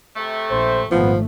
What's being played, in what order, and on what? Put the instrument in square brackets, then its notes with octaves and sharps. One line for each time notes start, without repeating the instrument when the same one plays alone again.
[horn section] C3 A3
[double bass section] A#1 [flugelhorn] C5
[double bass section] G#1 A#2 A3 [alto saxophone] F3 [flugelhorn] B3